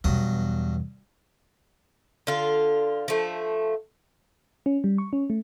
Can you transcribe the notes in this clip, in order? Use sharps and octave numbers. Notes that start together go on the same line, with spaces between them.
E2 G2 B2 F#3 D#6
D3 F4
F3 A3
C#4
G3
C#6
C#4
A3